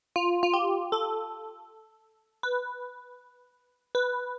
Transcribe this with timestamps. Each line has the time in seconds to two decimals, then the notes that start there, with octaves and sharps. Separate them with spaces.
0.16 F4
0.43 F4
0.54 G4
0.92 A4
2.43 B4
3.95 B4